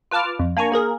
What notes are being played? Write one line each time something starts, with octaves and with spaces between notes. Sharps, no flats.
F4 B4 A5 D6 F6
F2
A#3 D4 G#5 A#5 C#6
A#3 G#4 A#4